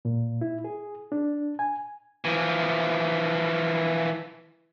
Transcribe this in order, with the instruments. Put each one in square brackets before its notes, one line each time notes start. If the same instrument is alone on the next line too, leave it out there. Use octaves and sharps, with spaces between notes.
[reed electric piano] A#2
E4
G#4
D4
G#5
[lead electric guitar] E3 F3